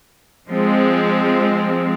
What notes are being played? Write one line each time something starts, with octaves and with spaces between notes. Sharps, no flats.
F3 G#3 C4